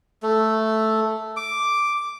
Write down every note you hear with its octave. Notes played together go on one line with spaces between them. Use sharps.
A3
D6